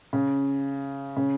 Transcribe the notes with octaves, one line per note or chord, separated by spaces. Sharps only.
C#3
C#3